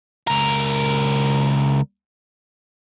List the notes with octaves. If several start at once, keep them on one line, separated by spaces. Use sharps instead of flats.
C#2 A#4